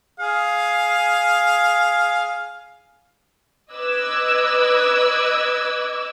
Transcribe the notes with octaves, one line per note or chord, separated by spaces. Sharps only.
G#4 F5
B4 D#5 D6 E6 F#6 G#6